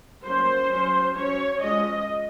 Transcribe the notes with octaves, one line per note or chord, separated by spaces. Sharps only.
F#3 A#3 C#4 C5
F#3 C#4
F#3 C#4 C#5
F3 G#3 C#4 D#5